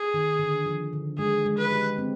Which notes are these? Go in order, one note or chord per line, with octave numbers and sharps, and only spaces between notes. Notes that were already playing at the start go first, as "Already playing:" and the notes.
Already playing: G#4
D#3
D3
F3
D3
G#3 G#4
G#3
B4
G4
C4